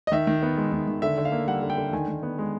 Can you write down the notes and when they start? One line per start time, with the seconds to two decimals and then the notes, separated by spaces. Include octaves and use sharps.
0.07 D#5
0.12 D#3 E5
0.27 D#3
0.42 B3
0.57 G#3
0.72 D#3
0.88 D#3
1.02 D3 E5
1.18 D3
1.25 F5
1.32 A#3
1.47 G3 F#5
1.63 D3
1.70 G5
1.78 D3
1.93 D#3 G#5
2.08 D#3
2.23 B3
2.39 G#3